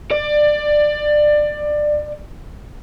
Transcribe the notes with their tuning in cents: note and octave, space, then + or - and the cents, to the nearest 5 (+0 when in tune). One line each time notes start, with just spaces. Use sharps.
D5 +20